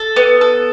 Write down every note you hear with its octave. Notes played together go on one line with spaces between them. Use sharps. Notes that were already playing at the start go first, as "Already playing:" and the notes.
Already playing: A4
B3
A4